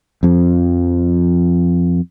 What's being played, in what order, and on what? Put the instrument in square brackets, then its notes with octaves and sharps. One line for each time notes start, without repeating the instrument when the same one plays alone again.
[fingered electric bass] F2 F3